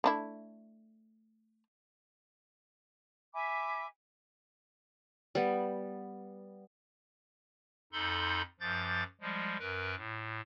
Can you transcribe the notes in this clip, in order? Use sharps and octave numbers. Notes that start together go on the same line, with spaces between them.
A3 D4 E4
E5 G#5 B5 D6
G3 B3
F2 D#4 A4 B5 C6 G6
F#2 F3 D6 G6 A6
F3 G3 G#3
F#2 A#4 B4
A2